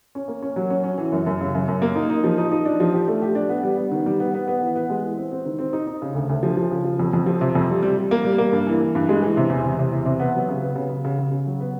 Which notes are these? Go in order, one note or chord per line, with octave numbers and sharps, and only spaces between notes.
C#4
A#3
C#4
F#3
C#4
C#4
E3
F#2
F#2
C#3
F#2
F#2
A#3
D#4
D#4
F3
D#4
D#4
D4
F3
G4
A3
G4
D4
B3
G3
B3
D#3
G3
B3
B3
B3
E3
B3
G#3
E3
C4
C4
D#3
C4
D#4
D#4
C#3
D2
D2
F3
F3
C#3
F3
F2
F2
F3
C3
F2
G3
G3
G3
A#3
G3
A#3
G2
E3
E3
G2
G#3
E3
C3
E2
C3
C3
E2
C3
B3
F#3
C#3
B3
C#3
C#3
C#3
C#3
C#3
F#3
B3